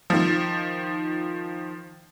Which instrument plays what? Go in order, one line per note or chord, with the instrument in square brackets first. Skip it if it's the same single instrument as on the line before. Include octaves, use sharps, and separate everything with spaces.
[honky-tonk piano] D#3 F3